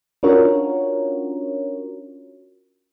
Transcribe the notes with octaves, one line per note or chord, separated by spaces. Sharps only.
C#4 D4 F4 F#4 A#4 C#5